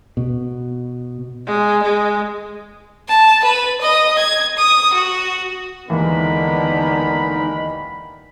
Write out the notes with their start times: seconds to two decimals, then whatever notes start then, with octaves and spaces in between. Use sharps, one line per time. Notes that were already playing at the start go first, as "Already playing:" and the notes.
0.17 B2
1.46 G#3
1.83 G#3
3.08 A5
3.44 B4
3.81 D#5
4.18 G#6
4.57 D#6
4.93 F#4
5.90 D#2 D3 E3 G#3 B3 D#4 A#4 B5